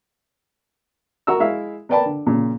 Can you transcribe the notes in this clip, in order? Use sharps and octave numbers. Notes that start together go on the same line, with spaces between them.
F#4 A#4 A#5 C#6 E6
G#3 E4 E5 F5
A#4 B4 D5 G5 A5 B5
D3
A#2 C#3